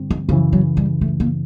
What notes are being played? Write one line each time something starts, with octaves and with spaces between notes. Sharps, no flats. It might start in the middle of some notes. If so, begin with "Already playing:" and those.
Already playing: G2 D3 G3 C4
E3
F#2 C#3 E3 F3
F#3
G3
A3
A#3